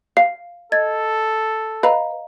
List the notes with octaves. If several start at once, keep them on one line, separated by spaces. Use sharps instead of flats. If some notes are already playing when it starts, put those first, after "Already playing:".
F5 C7
A4 D#5 G#6 A6
B4 D#5 F5 A#5